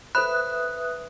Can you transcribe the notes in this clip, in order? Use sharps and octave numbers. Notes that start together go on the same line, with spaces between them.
A4 B4 C5 E5 B5 D#6 F#6